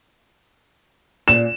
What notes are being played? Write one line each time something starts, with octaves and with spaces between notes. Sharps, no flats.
A#2 E7